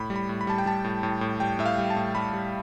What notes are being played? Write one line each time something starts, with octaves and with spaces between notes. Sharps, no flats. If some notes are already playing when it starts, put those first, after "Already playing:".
Already playing: A2 B5
G3
B5
A2
B5
G3 A5
G5
G3 A5
A2
A2
A2
G3 G5
A2 E5
F5
G3
A5
A2
G3 B5
G3